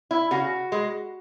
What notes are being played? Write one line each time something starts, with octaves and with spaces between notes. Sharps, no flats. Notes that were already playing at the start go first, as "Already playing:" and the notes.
E4
C#3 F#4
G#3